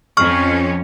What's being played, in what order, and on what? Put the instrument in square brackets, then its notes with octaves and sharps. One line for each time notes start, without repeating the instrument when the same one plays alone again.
[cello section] F2 C#4 [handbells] C#6 F6